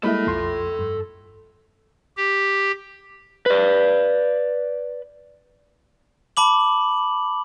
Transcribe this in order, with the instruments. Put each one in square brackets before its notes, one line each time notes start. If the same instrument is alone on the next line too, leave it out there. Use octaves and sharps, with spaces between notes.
[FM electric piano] G3 G#3 D#5 [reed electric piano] A#3 E4 E5 [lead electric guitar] A4 B5
[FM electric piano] B1 F4 [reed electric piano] F2 C6
[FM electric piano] G2
[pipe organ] G4
[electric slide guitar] B4 D5
[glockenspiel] A5 B5 D6 F#7